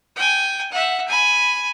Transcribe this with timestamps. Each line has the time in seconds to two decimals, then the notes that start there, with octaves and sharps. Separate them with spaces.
0.16 G5 G#5
0.72 E5 F#5
1.08 G#5 B5